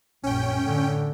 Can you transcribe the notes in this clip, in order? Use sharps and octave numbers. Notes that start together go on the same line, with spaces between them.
A#1 F#2 C#4 G5
A2 D3